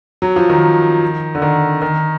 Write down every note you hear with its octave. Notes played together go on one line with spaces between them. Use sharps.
F#3
F3
D#3
D3
D#3
D#3